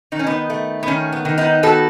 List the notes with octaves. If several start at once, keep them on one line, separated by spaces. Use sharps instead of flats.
D#3 D#4
C#4
B3 D#4
A3
B3
D#3 C#4
B3
D#3
B3 D#4
B3 F#4 A4